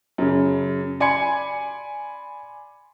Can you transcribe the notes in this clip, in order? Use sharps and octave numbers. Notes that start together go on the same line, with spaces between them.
F#2 C#3
D5 G#5 B5 C6 G#6 C#7